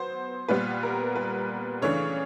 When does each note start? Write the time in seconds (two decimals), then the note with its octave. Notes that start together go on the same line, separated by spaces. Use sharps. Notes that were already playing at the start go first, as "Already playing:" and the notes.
Already playing: F#3 B3 C5
0.48 A#2 G3 B3 B4
0.83 A#4
1.15 B4
1.82 C#3 E3 A3 D4 C#5